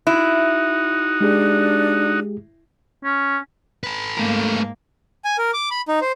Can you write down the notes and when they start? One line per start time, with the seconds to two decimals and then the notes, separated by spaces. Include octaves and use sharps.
0.07 D#4 E4 F#4
1.21 G#3 D4 G4 G#4
3.04 C#4
3.84 A4 B4
4.18 G#2 A3 A#3 A#4
5.24 G#5
5.38 A#4
5.53 D6
5.71 B5
5.88 D#4
6.01 C5